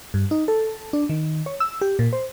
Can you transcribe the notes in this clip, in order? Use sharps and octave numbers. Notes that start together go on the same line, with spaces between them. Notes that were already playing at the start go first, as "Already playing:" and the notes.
G2
D#4
A4
D4
D#3
C#5
E6
G4
A#2
C5